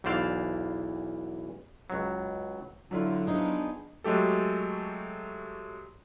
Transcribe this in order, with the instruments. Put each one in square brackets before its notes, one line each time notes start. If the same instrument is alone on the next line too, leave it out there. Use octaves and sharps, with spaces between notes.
[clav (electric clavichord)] B1 E2 E3 C5 D5 F5
C#2 F#3
[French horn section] D3 [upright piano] F#3 E4 F4
[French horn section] F3 D4 [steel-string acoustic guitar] B3 D#4 G#4
[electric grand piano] F#3 G#3 A3 G4 A4